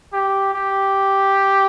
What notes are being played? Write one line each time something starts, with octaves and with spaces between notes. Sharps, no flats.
G4
G4